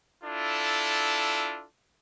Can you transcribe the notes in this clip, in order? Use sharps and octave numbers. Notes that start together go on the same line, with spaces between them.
D4 E4 F4 A4